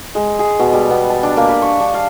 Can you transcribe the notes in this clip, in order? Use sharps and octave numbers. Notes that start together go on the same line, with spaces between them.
G#3
G#4
B2
G3
B3
A5
D4
A#3
B5
C#6
D4
F5